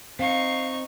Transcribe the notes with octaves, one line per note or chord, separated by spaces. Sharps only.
C4 D#4 F5 C#6